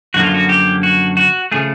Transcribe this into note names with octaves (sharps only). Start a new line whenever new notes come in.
F#2 D3 F3 A#3 F#4
F4
F#4
G4
F#4
F#4
C#3 F3 A3 G#4